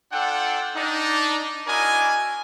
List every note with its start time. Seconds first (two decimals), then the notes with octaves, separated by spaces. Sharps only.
0.13 D4 F4 A4 F#5 G5
0.76 D4 D#4
1.67 D4 E4 F#4 A#4 D#5 G#5